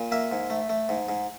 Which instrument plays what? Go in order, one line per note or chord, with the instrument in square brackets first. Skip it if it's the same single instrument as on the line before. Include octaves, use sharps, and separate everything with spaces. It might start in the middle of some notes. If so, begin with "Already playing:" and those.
Already playing: [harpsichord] A#2
A#3 E5
G#2
A3
A3
G#2
G#2